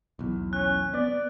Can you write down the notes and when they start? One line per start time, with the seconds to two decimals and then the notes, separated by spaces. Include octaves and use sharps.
0.19 B1 E2
0.53 C#4 F#6
0.94 B3 D5